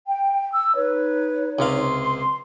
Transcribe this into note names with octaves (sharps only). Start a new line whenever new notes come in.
G5
E6
D#4 B4 C#5
C#2 C3 F5 C6